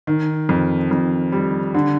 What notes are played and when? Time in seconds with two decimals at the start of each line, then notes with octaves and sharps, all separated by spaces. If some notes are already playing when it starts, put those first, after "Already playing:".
0.07 D#3
0.49 F2
0.91 F2
1.32 G3
1.74 D3